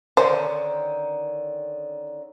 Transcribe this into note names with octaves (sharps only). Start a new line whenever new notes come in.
D3 D#3 C#4 C5